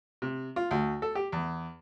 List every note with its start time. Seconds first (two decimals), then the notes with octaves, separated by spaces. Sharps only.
0.22 C3
0.56 F4
0.71 D2
1.02 A4
1.15 G4
1.32 E2